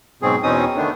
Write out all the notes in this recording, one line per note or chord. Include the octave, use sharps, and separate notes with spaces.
G#2 B2 F#3 C4 G#4
E2 B2 C4 C#4 D#4 D#6
D3 D#3 A3 B3 D4